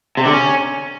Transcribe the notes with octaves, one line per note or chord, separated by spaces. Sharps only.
C3
D3
C#4